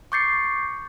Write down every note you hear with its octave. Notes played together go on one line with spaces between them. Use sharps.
C#6 D6 G6 A6 C7 C#7